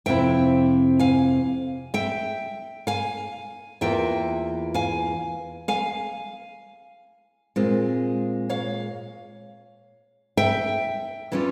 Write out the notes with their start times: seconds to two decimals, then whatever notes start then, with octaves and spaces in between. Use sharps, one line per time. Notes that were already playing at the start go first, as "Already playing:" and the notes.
0.06 F2 C3 F3 C4 E4 E5 G5
0.99 F5 G#5
1.94 E5 G5
2.87 F5 G#5
3.81 E2 E3 A#3 F4 E5 G5
4.74 F5 G#5
5.68 F5 G#5
7.56 A#2 G#3 C4 F4
8.49 C#5 F5
10.37 E5 G5
11.32 E3 G3 C#4 F4